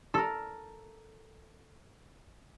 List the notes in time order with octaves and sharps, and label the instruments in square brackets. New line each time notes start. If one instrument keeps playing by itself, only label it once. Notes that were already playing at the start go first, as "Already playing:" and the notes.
[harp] A4 A#4